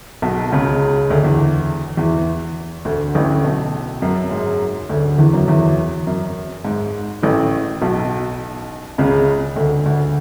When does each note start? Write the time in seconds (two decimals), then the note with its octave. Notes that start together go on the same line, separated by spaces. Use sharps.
0.22 B1 B2
0.52 C#2 C#3
1.10 D2 D3
1.24 E2 E3
1.97 E2 E3
2.85 D2 D3
3.14 A1 A2
3.44 B1 B2
4.02 F#2 F#3
4.31 G#2 G#3
4.89 D2 D3
5.18 E2 E3
5.33 F#2 F#3
5.48 E2 E3
6.07 F#2
6.65 G#2
7.23 A1 A2
7.81 B1 B2
8.98 C#2 C#3
9.56 D2 D3
9.86 D2 D3